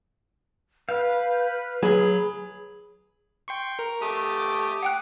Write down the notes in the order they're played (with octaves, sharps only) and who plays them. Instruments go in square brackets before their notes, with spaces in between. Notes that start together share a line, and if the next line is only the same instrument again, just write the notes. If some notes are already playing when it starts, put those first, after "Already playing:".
[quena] B4 [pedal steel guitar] F5 [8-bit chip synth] G6
[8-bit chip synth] F#3 B5 [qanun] G#4
[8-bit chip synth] G5 C6 C#6
A#4
[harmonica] A3 G4 [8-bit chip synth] D6 D#6
[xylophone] F#5 G5 F#6